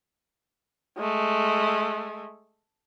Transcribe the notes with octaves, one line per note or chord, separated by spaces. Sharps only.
G#3 A3